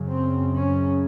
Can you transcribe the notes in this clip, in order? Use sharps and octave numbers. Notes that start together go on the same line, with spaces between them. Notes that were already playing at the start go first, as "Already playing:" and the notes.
Already playing: F#2 C#3
C4
C#4